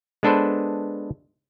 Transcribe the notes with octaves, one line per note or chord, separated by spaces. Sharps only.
G#3 B3 D4 A4 B4 C5